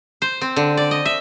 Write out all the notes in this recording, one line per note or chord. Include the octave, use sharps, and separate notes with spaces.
C5
C4
D3
D5
D#5
E5